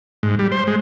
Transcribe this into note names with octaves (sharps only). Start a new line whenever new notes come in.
G#2
G3
C5
G#3